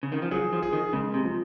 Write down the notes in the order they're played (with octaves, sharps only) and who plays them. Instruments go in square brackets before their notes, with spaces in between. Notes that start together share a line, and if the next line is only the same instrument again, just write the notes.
[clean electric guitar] C#3
D#3
F3
[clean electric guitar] F#3 [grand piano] G#4
[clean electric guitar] F3
[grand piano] G#4
[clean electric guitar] D#3
[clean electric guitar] C#3 [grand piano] G#3
[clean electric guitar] C3
[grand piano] F3